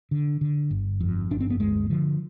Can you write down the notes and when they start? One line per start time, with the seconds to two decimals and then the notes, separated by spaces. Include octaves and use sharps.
0.11 D3
0.41 D3
0.71 G1
1.01 F2
1.31 G1 D4
1.41 C4
1.50 B3
1.60 D2 G#3
1.90 D3 F3